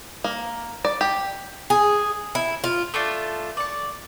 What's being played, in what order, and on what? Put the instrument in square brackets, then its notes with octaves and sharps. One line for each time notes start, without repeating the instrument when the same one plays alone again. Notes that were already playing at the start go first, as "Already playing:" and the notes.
[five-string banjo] A#3
D5
G4
[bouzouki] G#4
E4
F4
[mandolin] A3 D4 F4
D5 C#6